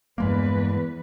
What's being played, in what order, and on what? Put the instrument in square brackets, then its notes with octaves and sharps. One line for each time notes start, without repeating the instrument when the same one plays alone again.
[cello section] E2 B4 [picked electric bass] G2 G#3 A#3